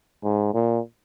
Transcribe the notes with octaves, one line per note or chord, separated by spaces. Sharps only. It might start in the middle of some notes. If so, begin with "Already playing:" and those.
G#2
A#2